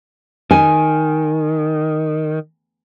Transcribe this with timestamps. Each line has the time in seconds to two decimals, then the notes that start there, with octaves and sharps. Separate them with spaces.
0.51 D#3 G#5